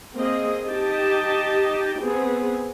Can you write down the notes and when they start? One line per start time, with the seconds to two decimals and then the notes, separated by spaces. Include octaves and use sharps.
0.15 A#3 C4 G#4 D#5
0.68 D#4 G4 D#5 G5 A5
2.00 B3 C4 G#4